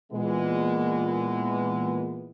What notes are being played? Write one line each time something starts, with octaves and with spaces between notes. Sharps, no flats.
A#2 E3 G#3 B3